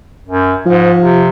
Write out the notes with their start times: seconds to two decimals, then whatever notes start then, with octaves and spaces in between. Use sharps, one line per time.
0.28 F#2
0.66 G#2 F3
1.03 C3